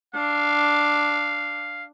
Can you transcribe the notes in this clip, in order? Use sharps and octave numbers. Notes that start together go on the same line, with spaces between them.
D4 F5